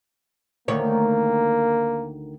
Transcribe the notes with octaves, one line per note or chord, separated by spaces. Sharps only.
D2 D#3 A#3 C#5